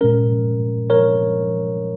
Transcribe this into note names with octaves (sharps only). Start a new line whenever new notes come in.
A#2 G#3 C#4 A#4
A#4 C#5